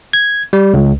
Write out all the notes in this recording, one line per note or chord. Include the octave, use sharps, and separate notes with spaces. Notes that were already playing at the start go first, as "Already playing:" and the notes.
G#6
G3
C#2